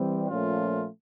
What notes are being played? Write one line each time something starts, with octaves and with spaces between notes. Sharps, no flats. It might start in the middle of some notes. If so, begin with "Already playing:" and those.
Already playing: E3 G3 C4
A#2 F3 A3 C#4 F4